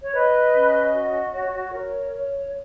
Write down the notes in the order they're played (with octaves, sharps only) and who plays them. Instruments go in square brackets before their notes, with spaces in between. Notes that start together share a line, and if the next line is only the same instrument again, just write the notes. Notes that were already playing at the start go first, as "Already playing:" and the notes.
[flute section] C#5
B4 D#5
C#4
F#4
C#5
A#4 C#5
C#5